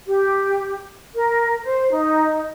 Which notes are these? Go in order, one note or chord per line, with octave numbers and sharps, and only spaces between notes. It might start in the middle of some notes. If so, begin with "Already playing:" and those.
G4
A#4
C5
D#4